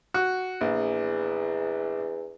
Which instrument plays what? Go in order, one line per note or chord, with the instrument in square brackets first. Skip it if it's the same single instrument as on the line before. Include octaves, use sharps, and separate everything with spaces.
[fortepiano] F#4
[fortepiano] A#1 [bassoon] E2